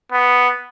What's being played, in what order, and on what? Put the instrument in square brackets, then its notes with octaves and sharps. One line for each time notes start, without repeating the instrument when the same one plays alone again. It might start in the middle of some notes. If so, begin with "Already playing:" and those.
[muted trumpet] B3